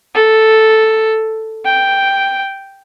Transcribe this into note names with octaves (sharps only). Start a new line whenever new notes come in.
A4
G5